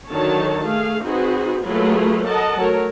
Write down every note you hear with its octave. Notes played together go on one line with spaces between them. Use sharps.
D3 D#3 F#3 D#4 C#5 A5
A3 G#4 F5
C4 D#4 F#4 G#4 B4
F#3 A3 A#3 F4 G#4 B4
A4 A#4 D#5 F#5 A5
F#3 A3 A#4 C#5